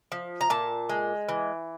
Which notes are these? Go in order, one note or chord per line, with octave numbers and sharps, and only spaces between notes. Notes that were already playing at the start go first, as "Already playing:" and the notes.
F3
A#5
A#2 A5
G#3
E3